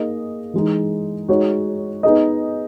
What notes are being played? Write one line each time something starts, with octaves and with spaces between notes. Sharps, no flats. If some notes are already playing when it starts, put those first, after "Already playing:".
Already playing: A#3 D#4 G#4 D#5
E3 G#3 D#4
G#3 D#4 F#4 C#5
B3 D#4 G#4 D#5